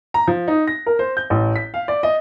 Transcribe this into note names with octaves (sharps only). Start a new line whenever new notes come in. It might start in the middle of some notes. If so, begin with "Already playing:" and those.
A#5
F3
D#4
A#6
A#4
C5
G6
A1
B6
F5
D5
D#5